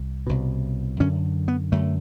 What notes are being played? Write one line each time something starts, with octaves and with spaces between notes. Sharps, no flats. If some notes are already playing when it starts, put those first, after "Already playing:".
Already playing: C2
C2 B2
F#2 D3 C#4
B3
F#2 D3 A3